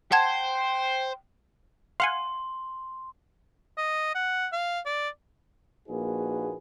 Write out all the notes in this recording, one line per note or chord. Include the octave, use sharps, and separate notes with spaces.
C5 F#5 G5 A5 G#6
F5 F#5 G#5 C6
D#5
F#5
F5
D5
A#1 A#3 D#4 F#4 G#4 B4